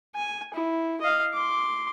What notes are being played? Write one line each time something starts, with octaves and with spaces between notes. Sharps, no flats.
G#5
E4
D#5 F5
C6 D6